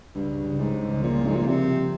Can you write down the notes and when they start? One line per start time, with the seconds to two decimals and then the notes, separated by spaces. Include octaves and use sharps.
0.15 C#2 G2
0.30 C#3
0.44 C#3
0.59 G#2 G3
0.73 C#2
0.88 C#2
1.02 A#2 F3
1.17 C4
1.26 G#2
1.32 A#2 C4
1.46 C3 C4
1.62 C4
1.76 C4